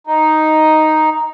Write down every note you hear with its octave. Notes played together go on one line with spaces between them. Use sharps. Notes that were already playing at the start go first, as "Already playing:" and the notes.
D#4